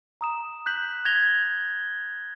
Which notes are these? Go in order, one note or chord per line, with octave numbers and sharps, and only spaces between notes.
A#5 D#6 E7
F#6 G6 B6 F#7
G6 G#6 A#6 F7 G7